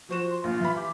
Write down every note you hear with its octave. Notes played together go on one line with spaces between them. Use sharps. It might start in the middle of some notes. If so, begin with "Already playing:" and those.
F3 F#4 C5 E7
C6
A#1 F4
E3 B5
G4